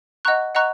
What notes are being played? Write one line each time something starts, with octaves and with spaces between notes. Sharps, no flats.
D#5 F#5 A#5 C#6 F#6
D#5 F#5 A#5 C#6 F#6